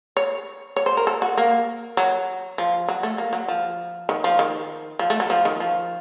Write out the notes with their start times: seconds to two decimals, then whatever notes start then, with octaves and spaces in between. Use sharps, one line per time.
0.17 C#5
0.76 C#5
0.86 C5
0.97 A#4
1.07 A4
1.22 F#4
1.37 A#3
1.97 F#3
2.58 F3
2.88 F#3
3.03 A3
3.18 A#3
3.33 F#3
3.48 F3
4.09 D#3
4.24 F3
4.39 D#3
4.99 F3
5.10 A3
5.20 F#3
5.30 F3
5.45 D#3
5.60 F3